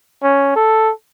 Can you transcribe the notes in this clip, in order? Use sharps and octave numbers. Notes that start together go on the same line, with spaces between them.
C#4
A4